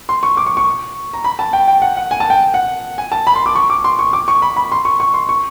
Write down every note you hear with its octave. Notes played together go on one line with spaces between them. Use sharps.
C6
C#6
D6
C#6
C#6
A#5
B5
A5
G5
G5
F#5
F#5
G#5
A5
G5
F#5
G#5
A5
B5
C6
D6
C#6
D6
C6
C#6
D6
C#6
B5
B5
C6
C#6
C#6
C6
C#6